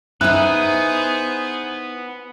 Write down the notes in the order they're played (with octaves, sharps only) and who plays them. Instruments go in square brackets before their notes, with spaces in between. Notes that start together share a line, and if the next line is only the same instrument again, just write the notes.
[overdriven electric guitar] B3 [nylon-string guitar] D#4 E4 [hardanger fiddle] G#4 C5 [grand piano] F#6